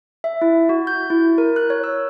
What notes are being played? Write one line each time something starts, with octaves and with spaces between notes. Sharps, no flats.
E5
E4
F#4
G6
E4
A#4
F#6
C#5
E6